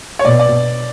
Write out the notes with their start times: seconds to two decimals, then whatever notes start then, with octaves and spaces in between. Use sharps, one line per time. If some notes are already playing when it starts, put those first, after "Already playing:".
0.19 C#5
0.25 B2 D5
0.39 D5